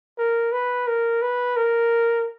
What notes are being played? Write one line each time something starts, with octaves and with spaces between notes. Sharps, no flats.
A#4
B4
A#4
B4
A#4